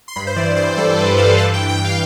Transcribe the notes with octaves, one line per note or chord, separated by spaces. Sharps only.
C6
G2 B5
C5
E3 D5
G2 C5
G3 A4
G2 B4
E3 F5
G2 A5
G5
E3
G5
G2
F5